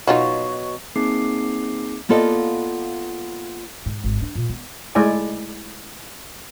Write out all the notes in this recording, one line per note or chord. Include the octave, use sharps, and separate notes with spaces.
B2 F#3 D#4 F4 F#4
A#3 C4 D#4 G#4 D6 C7
A#3 B3 F4 A4 D5 D#5
G#2
G#1
D4
A#2
B3
G#3 A3 E4 D5 G#5